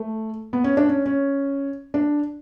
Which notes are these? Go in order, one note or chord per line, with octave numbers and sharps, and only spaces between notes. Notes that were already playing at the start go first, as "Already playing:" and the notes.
Already playing: A3
B3
C#4
D4
C#4
C#4
D4